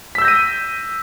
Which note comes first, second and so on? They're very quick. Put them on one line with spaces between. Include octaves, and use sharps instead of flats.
B6 E6 G6 A#6 D#7